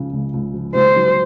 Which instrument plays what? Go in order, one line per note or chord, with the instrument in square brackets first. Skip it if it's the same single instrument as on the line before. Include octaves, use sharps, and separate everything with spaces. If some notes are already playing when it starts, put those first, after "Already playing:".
Already playing: [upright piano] C#2 C#3 F3
C#2
C#2
F3
[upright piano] C#2 [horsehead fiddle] C5
[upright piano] F#3